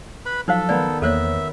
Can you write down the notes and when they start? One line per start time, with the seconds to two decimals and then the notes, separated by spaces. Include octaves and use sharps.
0.26 B4 B5
0.48 F3 F#3 D#4 A4 C5 F5
0.69 D#3 B3 D5
1.02 E2 A#3 A4 C5 C#5 E5